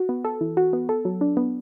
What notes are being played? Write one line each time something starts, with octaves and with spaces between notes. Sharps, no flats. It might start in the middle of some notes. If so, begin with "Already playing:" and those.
Already playing: F#4
B3
A4
E3
F#4
B3
A4
F#3
D4
B3